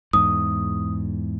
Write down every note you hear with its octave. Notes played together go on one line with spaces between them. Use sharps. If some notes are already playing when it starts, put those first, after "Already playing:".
E2 G#2 D#6